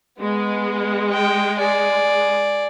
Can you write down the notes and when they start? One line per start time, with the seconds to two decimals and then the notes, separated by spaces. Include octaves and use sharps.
0.19 G#3 B3
1.12 G5
1.57 G#4 D5